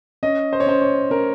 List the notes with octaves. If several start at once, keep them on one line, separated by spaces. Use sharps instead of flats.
C#4 D#5
C5
C#5
C#4 C5
C#5
C#4 A#4